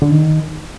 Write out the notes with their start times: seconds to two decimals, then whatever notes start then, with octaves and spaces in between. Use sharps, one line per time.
0.02 D3
0.11 D#3